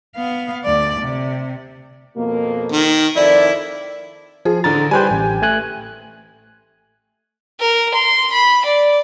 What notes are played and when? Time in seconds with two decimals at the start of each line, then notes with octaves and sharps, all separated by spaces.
0.16 B3 F5
0.64 D2 D5
1.01 C3
2.17 F2 B2 A#3
2.72 D#3
3.16 F2 D#3 E4 D5
4.45 F3 G#4
4.64 A1 D3 A#5 A6
4.91 G3 G4 B4 C5 G#5
5.11 A1
5.42 A3 G#5 F#6
7.60 A#4
7.94 C6
8.32 B5
8.65 D5